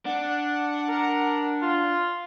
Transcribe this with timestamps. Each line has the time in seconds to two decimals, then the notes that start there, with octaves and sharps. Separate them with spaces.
0.06 D4 F#5
0.89 A#4
1.62 F4